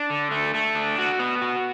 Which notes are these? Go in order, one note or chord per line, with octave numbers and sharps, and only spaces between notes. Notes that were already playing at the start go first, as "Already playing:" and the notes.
Already playing: D4
D3
A3
A3
D4
F#4
B3
F#4